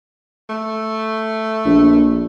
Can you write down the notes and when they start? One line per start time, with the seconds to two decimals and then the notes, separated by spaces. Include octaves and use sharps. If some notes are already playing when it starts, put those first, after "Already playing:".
0.50 A3
1.65 A#1